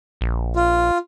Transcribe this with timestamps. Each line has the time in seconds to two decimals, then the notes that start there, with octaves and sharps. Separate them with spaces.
0.21 A#1
0.56 F4